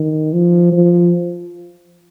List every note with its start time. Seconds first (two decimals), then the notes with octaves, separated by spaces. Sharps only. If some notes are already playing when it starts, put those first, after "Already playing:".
Already playing: D#3
0.33 F3
0.72 F3